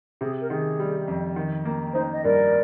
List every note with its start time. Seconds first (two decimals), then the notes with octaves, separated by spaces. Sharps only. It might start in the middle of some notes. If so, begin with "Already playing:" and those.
0.21 C3 G#4
0.42 A#4
0.50 D#3 G#4
0.79 G3
1.08 F2
1.36 D#3
1.65 A#3
1.95 D#4 C5
2.12 D#5
2.23 G2 A#4 D5